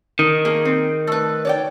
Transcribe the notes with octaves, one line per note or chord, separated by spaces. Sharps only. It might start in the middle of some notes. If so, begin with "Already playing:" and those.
D#3 D#4
A#3 G#4
C4
A3 B4
C#5 D5 G5